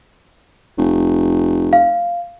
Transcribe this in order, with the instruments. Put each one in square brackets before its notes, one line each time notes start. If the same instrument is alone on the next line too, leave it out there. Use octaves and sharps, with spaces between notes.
[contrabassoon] F1
[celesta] F5